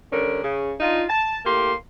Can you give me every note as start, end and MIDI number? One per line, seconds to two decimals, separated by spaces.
0.12 0.40 43
0.12 0.40 50
0.12 0.40 61
0.12 0.40 70
0.43 0.74 49
0.80 1.04 62
0.80 1.04 63
0.80 1.04 65
1.09 1.39 81
1.45 1.72 45
1.45 1.72 58
1.45 1.72 67
1.45 1.72 84